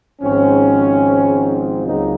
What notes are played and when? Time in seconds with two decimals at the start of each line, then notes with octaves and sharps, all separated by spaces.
0.21 G#1 G#2 F3 C4 C#4
1.85 C#2 C#3 F#3 A#3 C4 D#4